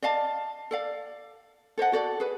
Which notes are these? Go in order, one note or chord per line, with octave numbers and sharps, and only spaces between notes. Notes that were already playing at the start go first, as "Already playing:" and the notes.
D5 D#5 F5 A5
A4 D5 F5
A4 C5 D#5 F#5
F#4 A4 D5
G#4 B4